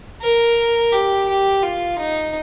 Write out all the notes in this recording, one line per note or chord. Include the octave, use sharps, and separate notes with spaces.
A#4
G4
G4
F4
D#4